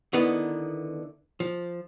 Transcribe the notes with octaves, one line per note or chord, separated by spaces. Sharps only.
D3 D#3 B3 E4 B4
F3